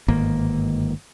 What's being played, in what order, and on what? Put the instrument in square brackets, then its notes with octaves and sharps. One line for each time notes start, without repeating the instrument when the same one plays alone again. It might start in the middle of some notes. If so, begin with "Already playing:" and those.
[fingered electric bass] G1 G#2 D#3 A#3